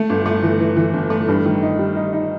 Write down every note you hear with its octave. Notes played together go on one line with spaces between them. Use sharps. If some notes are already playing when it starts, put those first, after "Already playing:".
Already playing: A3
G1
A3
E3
E3
E3
G1
A3
G2
D#3
D#4
G3
D#4
D#4